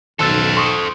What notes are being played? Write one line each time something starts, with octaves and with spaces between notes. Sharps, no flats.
B1 D#3 A4 C5 E6 A6
C6 C#6 D#6